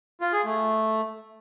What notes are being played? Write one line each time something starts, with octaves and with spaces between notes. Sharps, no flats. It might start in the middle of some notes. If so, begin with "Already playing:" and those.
F4
G#4
A3